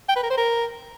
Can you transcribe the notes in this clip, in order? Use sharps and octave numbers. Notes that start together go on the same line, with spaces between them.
G5
B4
A#4
C5
A#4